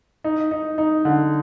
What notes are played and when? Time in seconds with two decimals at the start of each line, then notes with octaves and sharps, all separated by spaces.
0.24 D#4
0.51 D#4
0.78 D#4
1.05 D3